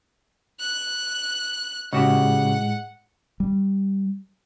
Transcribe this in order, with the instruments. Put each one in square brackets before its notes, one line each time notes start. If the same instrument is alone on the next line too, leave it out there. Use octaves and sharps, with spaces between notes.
[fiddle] F#6
[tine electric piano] A2 G#3 [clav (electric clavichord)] C#3 F#4 G4 [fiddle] F#5
[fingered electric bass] G3